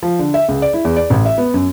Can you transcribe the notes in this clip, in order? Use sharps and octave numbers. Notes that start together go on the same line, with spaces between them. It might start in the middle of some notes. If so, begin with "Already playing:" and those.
F3
D3
E5
C#2
D5
E4
E2
D5
A1
E5
B3
F#2